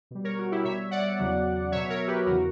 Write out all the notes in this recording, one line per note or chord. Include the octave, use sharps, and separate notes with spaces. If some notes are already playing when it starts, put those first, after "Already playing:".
B2 G3
A#4 C#5
F#4
E4 G4
B2 G3 C#5 E5
D5 F#5
E2 C#3 F#3
B2 F#3 C#5 E5
A#4 C#5
G4 B4
E2 C#3 E3 F#4 A#4